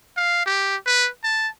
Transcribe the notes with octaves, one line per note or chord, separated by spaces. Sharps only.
F5
G4
B4
A5